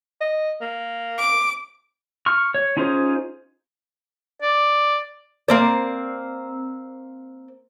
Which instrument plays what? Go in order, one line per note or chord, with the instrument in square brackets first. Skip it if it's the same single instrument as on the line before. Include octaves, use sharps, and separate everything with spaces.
[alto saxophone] D#5
A#3
[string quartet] D6
[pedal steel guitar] C#6 F6
C#5
C#4 D#4 F4 G#4 C5
[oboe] D5
[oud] A#3 C4 D5